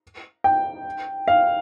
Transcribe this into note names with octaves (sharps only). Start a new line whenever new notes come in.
G5
F5